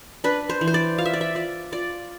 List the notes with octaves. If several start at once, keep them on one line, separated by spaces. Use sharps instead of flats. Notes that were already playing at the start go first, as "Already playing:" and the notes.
D4 B4
C5
E3
C5
D5
F4 F5
E5
D5
E5
F4 D5
F4 D5